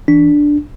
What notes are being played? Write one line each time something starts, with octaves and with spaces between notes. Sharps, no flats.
E3 D4